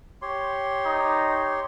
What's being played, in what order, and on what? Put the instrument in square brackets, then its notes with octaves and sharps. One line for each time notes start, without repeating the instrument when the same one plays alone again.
[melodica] G4 C#5 C6
[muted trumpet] D#4